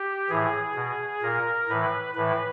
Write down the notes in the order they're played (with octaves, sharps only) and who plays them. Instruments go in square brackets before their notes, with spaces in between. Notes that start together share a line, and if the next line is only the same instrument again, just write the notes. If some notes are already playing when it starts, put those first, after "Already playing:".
Already playing: [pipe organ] G4
A2 E3 G#4
B2
A#2 A#4
A2 E3 B4
A2 E3 B4